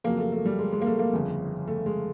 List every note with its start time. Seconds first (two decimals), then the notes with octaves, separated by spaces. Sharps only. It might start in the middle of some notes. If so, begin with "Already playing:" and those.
0.04 F2 C#3 F#3 A#3
0.18 A3
0.32 A3
0.46 G3
0.59 G#3
0.73 G#3
0.82 A#3
0.87 A3
0.99 A#3
1.13 G1 F2 C#3
1.68 A3
1.86 G#3